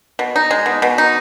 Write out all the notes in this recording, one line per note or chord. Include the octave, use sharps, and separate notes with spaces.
B2
D#4
G#3
B2
B2
D#4